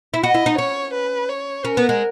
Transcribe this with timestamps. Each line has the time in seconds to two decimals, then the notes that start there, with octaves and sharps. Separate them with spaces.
0.14 E4
0.23 F#4 D#5
0.34 E4
0.46 D#4
0.58 C#4 C#5
0.94 B4
1.29 C#5
1.65 C#4 A#4
1.77 B3
1.89 G#3